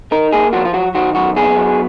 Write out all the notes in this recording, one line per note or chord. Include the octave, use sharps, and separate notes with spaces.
D#4 A#4
A#3 G#4
F3 F#4
F4
F#3 F#4
D#3 F#4
F#2 F#4
B3 G#4
F#3